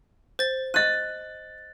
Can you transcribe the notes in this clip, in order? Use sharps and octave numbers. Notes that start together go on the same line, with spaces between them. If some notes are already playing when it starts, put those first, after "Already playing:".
C5 A6
D#5 F#6 A6 D#7